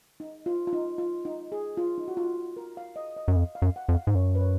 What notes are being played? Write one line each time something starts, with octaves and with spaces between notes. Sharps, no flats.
D#4
F4
F4
D#4
F4
D#4
G#4
F4
D#4
F#4
F4
A#4
F5
D#5
D#5
F#2
F2 F5
F5
F#2
F#5
F2
F5
G#2
F#2 C#5
B4
C#5